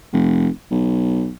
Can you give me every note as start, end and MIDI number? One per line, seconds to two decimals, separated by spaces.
0.12 0.48 29
0.71 1.30 35